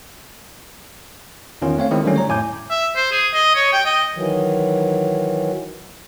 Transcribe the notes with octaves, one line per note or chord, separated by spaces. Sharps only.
E2 D#3 C#4 F4
A3 C4 C#5 F5
D#3 G#3 C4 E4
D3 D#3 F#3 G3 A3 C#4
C#5 A#5
F2 A2 G#5 D6 G6
E5
C5
G#4
D#5
C#5
G5
D#5
D#3 E3 F#3